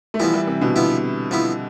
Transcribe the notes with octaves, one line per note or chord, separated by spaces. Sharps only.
A3
E3 F3 G3 B3 E4
E3 G3
C3 E3
B2 D3
F3 B3 E4
F3 B3 E4